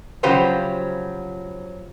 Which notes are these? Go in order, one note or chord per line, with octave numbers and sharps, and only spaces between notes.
C#3 F3 F#3 G4 B4 C5